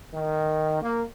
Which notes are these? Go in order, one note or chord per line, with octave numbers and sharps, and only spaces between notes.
D#3
A#3